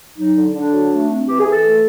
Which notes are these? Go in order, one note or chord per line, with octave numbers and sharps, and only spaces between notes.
F#3 D#4
D3
D3 D4
F#3
A3
C4
E3 G4
G#4
E3
A4
A3